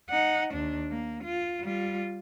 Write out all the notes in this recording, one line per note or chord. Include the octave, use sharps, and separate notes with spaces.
D#4 F#5
D#2 D4
A#3
F4
G3 F4